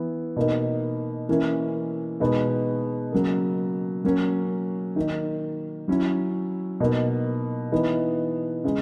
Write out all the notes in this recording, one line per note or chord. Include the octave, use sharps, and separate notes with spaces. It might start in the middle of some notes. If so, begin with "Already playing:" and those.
Already playing: E3 B3 E4
B2 A#3 D#4
E3 A#3 C#4 E4
B2 G#3 B3 D#4
C#3 F#3 A#3
F#3 A#3 C#4
D#3 A#3 D#4
F#3 C#4 E4
B2 A#3 D#4
E3 B3 D#4
C#3 G#3